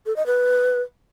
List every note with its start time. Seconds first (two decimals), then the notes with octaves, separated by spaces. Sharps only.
0.06 A4
0.16 D#5
0.26 B4